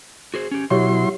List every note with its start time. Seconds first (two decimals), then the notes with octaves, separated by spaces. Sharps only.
0.34 F#4 G#4 C5
0.51 C#4 G4
0.70 B2 F#3 E4 G4 C#5 C6 C#6